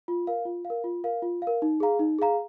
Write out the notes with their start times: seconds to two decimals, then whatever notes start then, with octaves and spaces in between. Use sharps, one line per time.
0.08 F4
0.27 A#4 F5
0.45 F4
0.65 F5
0.70 A#4
0.84 F4
1.04 A#4 F5
1.22 F4
1.42 F5
1.47 A#4
1.62 D#4
1.80 G#4 F5 A#5
1.99 D#4
2.19 G#4 F5 A#5